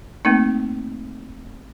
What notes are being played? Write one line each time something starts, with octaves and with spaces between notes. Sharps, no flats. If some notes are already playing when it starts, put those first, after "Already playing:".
A3 A#3 C4 D#4